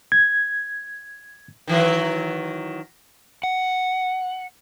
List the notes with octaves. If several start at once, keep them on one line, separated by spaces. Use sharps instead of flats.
G#6
D#3 E3 F#3
F#5